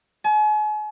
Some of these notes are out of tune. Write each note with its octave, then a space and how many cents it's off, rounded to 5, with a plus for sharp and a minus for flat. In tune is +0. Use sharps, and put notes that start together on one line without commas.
G#5 +40